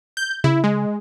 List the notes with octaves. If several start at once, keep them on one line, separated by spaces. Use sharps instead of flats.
G6
C#3 E4
G#3